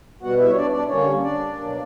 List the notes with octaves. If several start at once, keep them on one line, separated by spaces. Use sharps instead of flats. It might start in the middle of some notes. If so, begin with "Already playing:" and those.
B2 G3 B3 F#4 F#5
E4 E5
C#5
D4 D5
D4 D5
D3 G3 A#3 C#4 C#5
D4 D5
B2 F#3 A#3